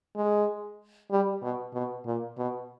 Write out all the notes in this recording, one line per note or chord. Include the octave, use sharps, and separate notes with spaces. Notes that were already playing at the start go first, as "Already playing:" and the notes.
G#3
G3
B2
B2
A#2
B2